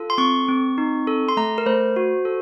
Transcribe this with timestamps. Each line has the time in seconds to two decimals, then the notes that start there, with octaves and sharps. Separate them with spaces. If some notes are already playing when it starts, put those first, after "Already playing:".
Already playing: F4 A4
0.10 C6
0.18 C4 C#6
0.48 C4
0.78 D#4
1.07 A4
1.29 C6
1.37 A3 A#5
1.58 A#4
1.66 A3 C5
1.96 F#4
2.25 A4